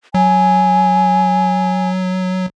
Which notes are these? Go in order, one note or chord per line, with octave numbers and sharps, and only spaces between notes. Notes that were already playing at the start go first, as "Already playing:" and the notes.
F#3 G#5